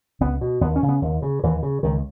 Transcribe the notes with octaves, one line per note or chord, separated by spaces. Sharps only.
C#2 B3
B2
D#2 B3
C#4
C#3
B3
D#2
C#3
D#2 E3
C#3
C#2 D#3